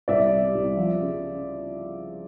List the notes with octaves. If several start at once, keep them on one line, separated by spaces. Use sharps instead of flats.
C2 D5 E5
C3
C2
F3
C#3